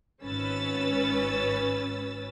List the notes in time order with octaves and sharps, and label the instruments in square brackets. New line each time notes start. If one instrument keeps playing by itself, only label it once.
[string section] G#1 C#4 B4 E6 A6